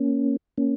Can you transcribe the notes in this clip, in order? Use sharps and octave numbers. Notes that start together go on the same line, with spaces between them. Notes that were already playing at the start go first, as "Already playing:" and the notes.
Already playing: A#3 C#4
A#3 C#4